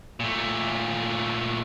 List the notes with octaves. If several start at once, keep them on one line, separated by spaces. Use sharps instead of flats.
A#2 A3